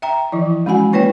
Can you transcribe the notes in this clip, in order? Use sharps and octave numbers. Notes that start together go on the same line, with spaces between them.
E5 G5 A#5
E3 F3 E4
G#3 C#4 F#4 F#5 G#5
A#3 E4 B4 C#5 G5